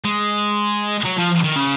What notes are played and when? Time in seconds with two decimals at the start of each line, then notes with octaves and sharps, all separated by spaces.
0.05 G#3
1.05 F#3
1.18 F3
1.44 D#3
1.56 C#3